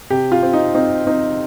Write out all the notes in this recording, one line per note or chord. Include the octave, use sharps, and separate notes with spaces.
C3 G4
F4
C4
D#4
C4 D#4
C4 D#4